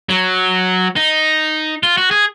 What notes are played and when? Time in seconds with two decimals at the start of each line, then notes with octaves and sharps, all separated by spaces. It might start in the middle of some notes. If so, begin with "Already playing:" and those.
0.09 F#3
0.96 D#4
1.83 F4
1.97 F#4
2.11 G#4